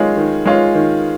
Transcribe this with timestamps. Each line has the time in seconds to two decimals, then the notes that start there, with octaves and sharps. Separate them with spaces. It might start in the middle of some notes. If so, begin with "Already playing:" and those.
Already playing: D#3 G#3 C#4 F4
0.17 D#3
0.45 G#3 C#4 F4
0.75 D#3